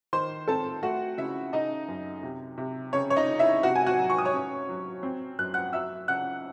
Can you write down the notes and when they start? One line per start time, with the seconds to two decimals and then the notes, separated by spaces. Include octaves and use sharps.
0.13 D#3 C5 C6
0.48 C4 A4 A5
0.83 A3 F#4 F#5
1.18 C#3 E4 E5
1.53 C#3 D#4 D#5
1.88 F#2
2.23 C3
2.58 C3
2.93 C#3 C#5
3.10 C#5
3.16 D#4 D#5
3.28 C#3
3.39 E4 E5
3.63 C3 F#4 F#5
3.75 G#5
3.87 F#4 F#5
3.98 F#3
4.10 C#6
4.18 D#6
4.25 C#5 C#6
4.33 C#4
4.69 F#3
5.03 C4
5.39 F#2 F#6
5.54 F#5 F#6
5.73 F#3 E5 E6
6.08 C#3 F#5 F#6